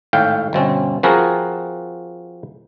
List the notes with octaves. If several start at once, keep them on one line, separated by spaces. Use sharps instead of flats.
G#1 A2 F5 G5
G1 B2 C4 C#4
F3 C4 F#4 G#4 A#4 B4